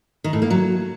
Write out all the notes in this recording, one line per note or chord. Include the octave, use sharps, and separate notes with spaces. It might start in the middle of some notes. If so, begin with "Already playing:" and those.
D#3
A2
A#3
F#3